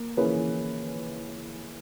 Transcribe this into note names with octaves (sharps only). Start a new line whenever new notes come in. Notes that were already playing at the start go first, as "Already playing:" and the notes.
Already playing: A#3
E3 A#3 C#4 G#4 B4